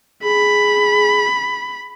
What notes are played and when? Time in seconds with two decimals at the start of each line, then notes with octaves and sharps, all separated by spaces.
0.24 G#4 B5